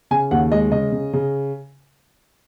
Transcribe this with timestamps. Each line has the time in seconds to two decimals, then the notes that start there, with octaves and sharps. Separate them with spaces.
0.11 C#3 G#5
0.31 D#2 F#5
0.51 G#3 D#5
0.72 C#3 D#5
0.92 C#3
1.13 C#3